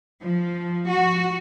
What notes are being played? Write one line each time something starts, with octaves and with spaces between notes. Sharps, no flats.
F3
F#4